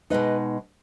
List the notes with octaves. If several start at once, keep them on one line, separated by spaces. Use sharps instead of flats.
B2 G#3 D#4 B4 D#5